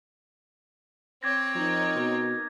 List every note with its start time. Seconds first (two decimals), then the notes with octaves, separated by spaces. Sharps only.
1.23 C4 C#5 D6 G#6 A#6
1.55 F3 D#4 A#4
1.95 B2